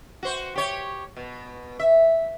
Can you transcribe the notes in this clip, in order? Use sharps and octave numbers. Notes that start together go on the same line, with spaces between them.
F#4 C5
G4 C#5
B2
E5